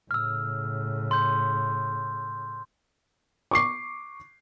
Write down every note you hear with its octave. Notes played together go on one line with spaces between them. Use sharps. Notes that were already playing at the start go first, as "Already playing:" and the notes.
A2 C#3 E6 F6
C6 G6
C#6 D6 C7